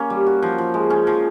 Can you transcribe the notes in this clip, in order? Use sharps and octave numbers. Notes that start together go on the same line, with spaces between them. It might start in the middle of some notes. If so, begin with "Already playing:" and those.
Already playing: A#3 C#4
G3
F#4
F3
F3
G#3
C#4
F3